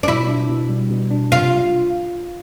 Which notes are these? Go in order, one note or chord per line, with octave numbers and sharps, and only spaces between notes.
D4
B2 E4
D4
B2
G3
B2
D4
C3 F4